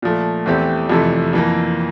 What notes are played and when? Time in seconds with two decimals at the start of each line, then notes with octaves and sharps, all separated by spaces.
0.02 A#2 F3 A3
0.46 E2 E3 A3 C4 G4
0.90 F2 C3 E3 A3
1.33 F2 E3 A#3